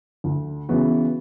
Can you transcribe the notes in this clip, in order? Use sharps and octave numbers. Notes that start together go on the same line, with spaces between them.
D2
C#3 E3 B3 F#4